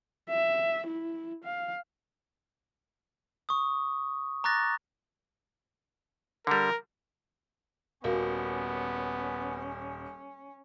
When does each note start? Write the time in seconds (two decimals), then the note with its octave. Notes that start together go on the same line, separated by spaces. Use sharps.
0.29 E5
0.87 E4
1.44 F5
3.49 C#6 D#6
4.44 A#5 C#6 D6 F#6 A6 A#6
6.47 D3 G3 A#4
8.04 D#1 B3 C#4 F#4 A#4 F5